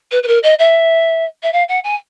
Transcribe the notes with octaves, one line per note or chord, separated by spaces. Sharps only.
B4
B4
A#4
D#5
E5
E5
F5
F#5
G#5